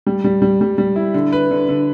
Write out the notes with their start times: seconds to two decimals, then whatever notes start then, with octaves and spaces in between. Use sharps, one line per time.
0.07 G3
0.24 G3
0.42 G3
0.61 G3
0.78 G3
0.96 E4
1.14 D3
1.33 B4
1.51 D3
1.69 D3